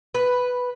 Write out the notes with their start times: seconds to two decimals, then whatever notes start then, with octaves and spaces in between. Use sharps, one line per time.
0.14 B4